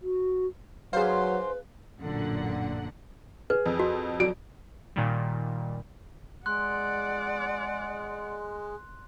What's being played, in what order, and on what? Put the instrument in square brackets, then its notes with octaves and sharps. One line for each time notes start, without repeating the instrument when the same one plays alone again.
[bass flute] F#4
[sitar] G#2 C5 [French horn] F#3 [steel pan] G#4 F5 [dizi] B4
[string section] A1 F#2 A#2 D3 F#5
[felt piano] G#4 [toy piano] B4
[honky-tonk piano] F2
[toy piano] F#4
[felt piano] F#3 D5 D7
[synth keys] A#2 D#3 G3
[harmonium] G#3 [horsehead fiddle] D5 F#5 [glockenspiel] C6 F#6